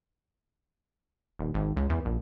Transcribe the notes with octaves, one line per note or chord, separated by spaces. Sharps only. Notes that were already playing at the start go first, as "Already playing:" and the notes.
D#1
G#1
C#2
E2
A#1